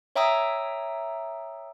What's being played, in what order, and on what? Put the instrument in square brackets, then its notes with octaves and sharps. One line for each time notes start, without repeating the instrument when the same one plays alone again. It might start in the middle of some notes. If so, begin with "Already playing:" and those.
[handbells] C#5 E5 G5 A#5 D#6 E6